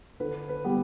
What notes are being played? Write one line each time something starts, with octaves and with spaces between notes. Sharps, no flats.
D3 B4
B4
G3 B3